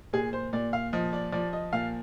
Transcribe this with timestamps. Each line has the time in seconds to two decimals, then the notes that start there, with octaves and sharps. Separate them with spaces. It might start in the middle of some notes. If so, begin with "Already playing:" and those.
0.13 A#2 G#4
0.33 C5
0.53 A#2 D5
0.73 F5
0.93 F3 D#5
1.13 D5
1.32 F3 D5
1.53 D#5
1.73 A#2 F5